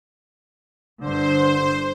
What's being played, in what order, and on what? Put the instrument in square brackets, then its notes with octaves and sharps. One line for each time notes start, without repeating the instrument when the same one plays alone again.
[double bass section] G1 G2 D3 [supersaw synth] C5